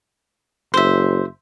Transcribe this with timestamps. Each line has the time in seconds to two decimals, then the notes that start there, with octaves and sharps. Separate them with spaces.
0.74 F#1 C5 E5